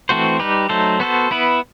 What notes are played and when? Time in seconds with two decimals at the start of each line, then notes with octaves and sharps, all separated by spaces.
0.09 E3 A3 C4 F#4 C5
0.39 G3 D#4 G4 B4
0.69 F#3 A3 D#4 A4 C5
1.00 B3 F#4 A4 C5
1.31 B3 E4 B4